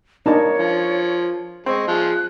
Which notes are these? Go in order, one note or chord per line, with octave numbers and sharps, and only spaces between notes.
A#3 D4 D#4 C#5 A5
F3
G#3 C4 C#6
F3 G#4 F#6